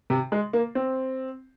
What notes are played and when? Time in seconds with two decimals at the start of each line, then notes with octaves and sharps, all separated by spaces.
0.10 C3
0.32 G#3
0.53 A#3
0.75 C4